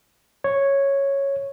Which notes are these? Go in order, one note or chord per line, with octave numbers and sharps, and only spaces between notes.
C#5